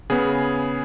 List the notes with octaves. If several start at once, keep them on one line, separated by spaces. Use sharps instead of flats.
C#3 B3 G#4